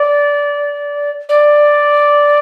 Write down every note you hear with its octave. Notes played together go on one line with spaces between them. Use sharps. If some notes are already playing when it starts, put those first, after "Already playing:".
Already playing: D5
D5